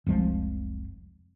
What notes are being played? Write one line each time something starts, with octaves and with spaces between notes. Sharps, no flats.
F1 C2 F3 G#3